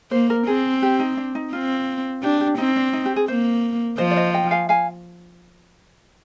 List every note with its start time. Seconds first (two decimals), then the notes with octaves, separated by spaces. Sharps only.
0.11 A#3 C5
0.30 A#4
0.47 C4 G#4
0.82 G4
0.99 D#4
1.17 D4
1.35 D#4
1.53 C4 F4
2.22 D4 G4
2.41 G4
2.58 C4 D#4
2.76 D4
2.93 D#4
3.05 G4
3.16 G#4
3.28 A#3 C5
3.98 F3 C5 D#5
4.11 D5
4.17 C5 D#5
4.34 D#5 G5
4.51 F5 G#5
4.69 F5 G#5